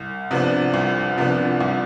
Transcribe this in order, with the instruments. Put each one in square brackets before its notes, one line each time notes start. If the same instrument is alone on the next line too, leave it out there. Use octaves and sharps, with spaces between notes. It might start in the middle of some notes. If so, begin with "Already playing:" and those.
Already playing: [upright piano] C2
C3 F3 B3 D4
C2
C3 F3 B3 D4
C2